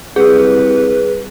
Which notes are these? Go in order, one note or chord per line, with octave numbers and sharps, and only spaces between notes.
C2 G#4 B4